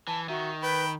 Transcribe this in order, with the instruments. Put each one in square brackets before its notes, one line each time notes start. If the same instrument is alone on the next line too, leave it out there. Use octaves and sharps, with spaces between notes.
[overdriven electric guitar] E3 [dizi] A5
[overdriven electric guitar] D#3 [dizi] F#4 [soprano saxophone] E5
[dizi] B4 [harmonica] G5 [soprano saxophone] B5